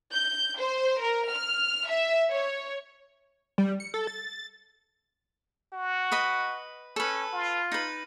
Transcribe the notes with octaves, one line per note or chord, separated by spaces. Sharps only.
G6
C5
A#4
F6
E5
C#5
G3
C#7
A4
A6
F#4
B4 D#5 B5
C#4 A4 B4
F4
D#4 B4